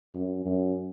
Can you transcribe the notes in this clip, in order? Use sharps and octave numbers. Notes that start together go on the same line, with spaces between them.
F#2
F#2